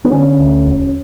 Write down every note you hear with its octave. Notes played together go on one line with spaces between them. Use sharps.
B3
D3 C#4
D2
E1